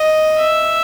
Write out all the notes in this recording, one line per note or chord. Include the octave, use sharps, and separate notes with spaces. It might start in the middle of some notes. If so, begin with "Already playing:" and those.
Already playing: D#5
E5